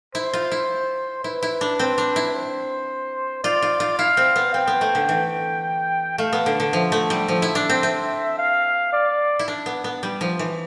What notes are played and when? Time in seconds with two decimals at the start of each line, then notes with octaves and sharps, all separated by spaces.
0.15 E4 C5
0.33 F4
0.52 E4
1.24 E4 B4
1.43 E4
1.61 D4
1.79 C4
1.98 D4
2.16 E4
2.35 C5
3.44 F4 D5
3.62 F4
3.80 F4
3.99 E4 F5
4.17 C4
4.36 B3
4.54 C4 G5
4.67 B3
4.81 A3
4.95 D3
5.09 E3
6.18 A3 F5
6.33 B3
6.46 D3
6.60 D3
6.73 F3 E5
6.92 A3
7.10 G3
7.28 F3
7.42 E4
7.55 D4
7.70 C4
7.83 C4
8.38 F5
8.93 D5
9.39 E4
9.48 D4
9.66 B3
9.84 B3
10.03 G3
10.21 F3
10.39 E3